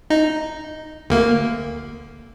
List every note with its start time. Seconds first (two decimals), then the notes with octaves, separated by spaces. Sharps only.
0.10 D#4
1.10 D2 A#3